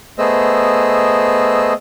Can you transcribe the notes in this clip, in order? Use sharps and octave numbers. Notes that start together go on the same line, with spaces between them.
A3 B3 G#4 C5 D#5 E6